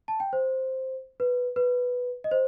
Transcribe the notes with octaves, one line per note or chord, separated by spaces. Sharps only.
A5
G5
C5
B4
B4
D#5
C5